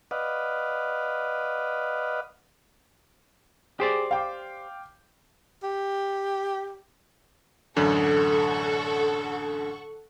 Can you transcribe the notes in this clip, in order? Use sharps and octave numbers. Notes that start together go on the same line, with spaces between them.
B4 D5 D#5 F5 F#5
G4 G#4 C5 D5
F5 G5 D6
G4
A1 F#2 D3 A4 F#5 C#6